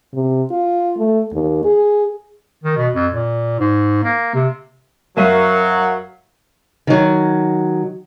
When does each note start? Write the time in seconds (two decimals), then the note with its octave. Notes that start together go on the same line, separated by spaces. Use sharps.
0.14 C3
0.51 F4
0.98 A3
1.33 D#2
1.65 G#4
2.63 D#3
2.77 B2
2.95 F2
3.13 A#2
3.60 G#2
4.03 A#3
4.34 C3
5.17 F#2 F#3 A#4 E5 F5 D#7
6.87 D#3 F#3